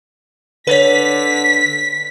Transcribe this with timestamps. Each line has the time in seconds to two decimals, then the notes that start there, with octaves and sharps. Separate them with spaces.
0.67 D3 B4 C#5 B6